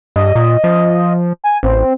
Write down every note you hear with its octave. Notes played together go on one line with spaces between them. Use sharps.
G2 D#5
A#2
F3
G#5
A1 C4